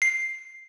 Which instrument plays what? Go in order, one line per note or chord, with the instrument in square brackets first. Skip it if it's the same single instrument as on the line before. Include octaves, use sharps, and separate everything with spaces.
[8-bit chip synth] C7